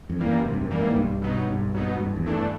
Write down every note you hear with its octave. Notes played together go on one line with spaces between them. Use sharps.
F2
E3 G3 A#3
F#2
F#2 C3
G2
F#2
E3 G3 A#3
G#2
B1 G2
B2 F#3 B3 D#4
B1 G2
B2 F#3 B3 D#4
A1 G2
E2
G2 E3 A3 D4